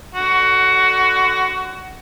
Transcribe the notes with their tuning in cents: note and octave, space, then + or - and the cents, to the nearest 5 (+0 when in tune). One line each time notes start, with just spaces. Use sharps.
D3 +0 F#4 +15